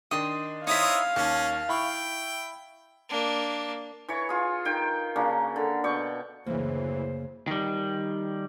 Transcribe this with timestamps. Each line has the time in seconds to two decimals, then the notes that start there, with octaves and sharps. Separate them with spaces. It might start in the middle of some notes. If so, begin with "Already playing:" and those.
0.11 D#3 D4 D#5 G5 C6
0.67 C4 D#4 E4 C#5 E5 F5 D#6
1.16 D#2 C#4 A5
1.69 E4 G5 B5 C#6
3.09 A#3 D4
4.09 E3 C#5 C#6
4.29 F4 G#4
4.65 D#3 G5
5.16 C#3 F#3 A#3 D4
5.56 D3
5.84 B2 D5 G5 C#6
6.46 F#1 D2 C#3 E3 A#3 C5
7.47 D#3 G3